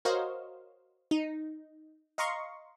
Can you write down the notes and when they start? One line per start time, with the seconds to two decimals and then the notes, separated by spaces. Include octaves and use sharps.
0.05 F#4 A#4 C5 C#5 D#5 F5
1.11 D#4
2.18 D#5 F5 A#5 C6 C#6